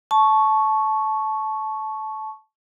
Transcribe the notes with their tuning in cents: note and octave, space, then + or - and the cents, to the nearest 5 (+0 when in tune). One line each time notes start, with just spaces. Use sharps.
A5 -20 C#6 +0